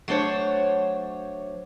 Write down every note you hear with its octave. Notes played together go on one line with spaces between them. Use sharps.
F#3 A3 D4 C5 C#5